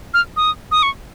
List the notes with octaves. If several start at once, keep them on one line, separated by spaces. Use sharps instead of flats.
F6
D#6
D#6
C#6